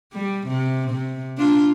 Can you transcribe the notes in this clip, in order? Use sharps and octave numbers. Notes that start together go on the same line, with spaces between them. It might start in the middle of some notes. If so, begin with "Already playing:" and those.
G3
C3
C3
D4 F4